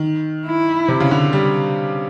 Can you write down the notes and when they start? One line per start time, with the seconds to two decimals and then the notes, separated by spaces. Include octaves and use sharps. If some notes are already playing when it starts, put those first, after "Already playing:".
Already playing: D#3
0.46 E4
0.88 C3
1.00 C#3
1.11 D3
1.33 G3